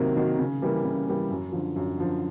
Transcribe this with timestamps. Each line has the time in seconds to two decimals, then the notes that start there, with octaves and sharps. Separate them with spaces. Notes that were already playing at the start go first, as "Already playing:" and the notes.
Already playing: C3 D#3 F#3 A#3
0.16 D#3 F#3 A#3
0.38 C#3
0.62 E3 G3 A#3
0.84 C#3
1.06 E3 G3 A#3
1.30 F#2
1.52 D3 F3
1.76 F#2
1.97 D3 F3